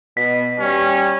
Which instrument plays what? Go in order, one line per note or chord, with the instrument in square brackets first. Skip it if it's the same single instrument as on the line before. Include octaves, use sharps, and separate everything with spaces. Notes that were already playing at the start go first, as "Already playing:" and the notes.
[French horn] B2 [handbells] B6
[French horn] G3 [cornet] C#4